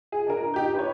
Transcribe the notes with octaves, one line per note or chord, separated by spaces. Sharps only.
G#4
D4 A#4
D#4 G4 G6
B4 C#5